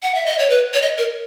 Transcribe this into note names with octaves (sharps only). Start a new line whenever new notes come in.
F#5
E5
D#5
C#5
B4
C#5
D#5
A#4